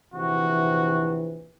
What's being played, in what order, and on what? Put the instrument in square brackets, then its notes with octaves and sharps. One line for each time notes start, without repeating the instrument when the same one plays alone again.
[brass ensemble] A#1 C3 E3 [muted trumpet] F#4